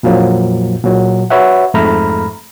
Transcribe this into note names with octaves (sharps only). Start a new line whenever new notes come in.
F2 A#2 F3 F#3 A#3
A#2 F#3
F#4 B4 C#5 E5 F#5
F2 G#2 A3 A#5 B5 F6